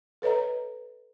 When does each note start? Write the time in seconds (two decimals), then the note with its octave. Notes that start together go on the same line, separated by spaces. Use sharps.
0.22 A4 B4 C#5 D#5 A#5